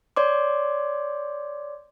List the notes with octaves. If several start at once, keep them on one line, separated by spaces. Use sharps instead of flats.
C#5 D5 C6 D6